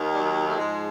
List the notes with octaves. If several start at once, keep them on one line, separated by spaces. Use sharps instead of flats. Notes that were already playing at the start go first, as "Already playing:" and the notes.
Already playing: D#2 D#3
G3
F#3
A3
G#2 F3 G#3